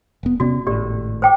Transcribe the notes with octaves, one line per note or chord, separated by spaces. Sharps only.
E1 B3
C3 B3 C#4 F#4 D5
G#1 A2 G4 D5
C5 G5 D6